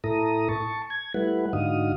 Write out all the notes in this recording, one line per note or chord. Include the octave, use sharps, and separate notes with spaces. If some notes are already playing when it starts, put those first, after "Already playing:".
A2 E4 A4 A#5 D#6
A5 C#6
G#6
G3 A3 E4 B4 F#5
G#2 D3 D#4 F#4 F5 D#6